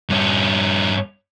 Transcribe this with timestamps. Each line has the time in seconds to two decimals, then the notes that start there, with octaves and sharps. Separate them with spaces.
0.10 G2 C#4